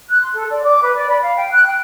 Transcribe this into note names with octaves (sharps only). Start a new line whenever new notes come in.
F#6
C6
A4
D5
D6
B4
D5
B5
F5
G5
F#6
G5